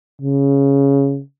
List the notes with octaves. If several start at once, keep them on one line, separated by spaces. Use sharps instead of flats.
C#3